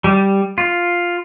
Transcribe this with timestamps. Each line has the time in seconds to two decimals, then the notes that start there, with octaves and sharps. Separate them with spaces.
0.04 G3
0.58 F4